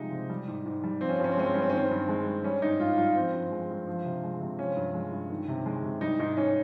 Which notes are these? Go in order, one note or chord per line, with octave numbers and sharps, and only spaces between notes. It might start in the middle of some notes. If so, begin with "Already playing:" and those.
Already playing: C3 F3 G3 G#3 D#4
C3
G3
G#2
G#2
G3
F3 C4
C#4
C4
G2 C#4
C4
G#3 C#4
C4
G2 C#4
C4
C#4
D#3 C4
G2
G#3
G2
G3 C#4
G#2 D#4
G#2 F4
G3 F4
F3 C4
G2
G#3
G2
F3
C3
G#3
C3
F3 C#4
G2
G#3
G2
D#3
C3
G#3
C3
G3 D#4
G#2 D#4
G#2 C#4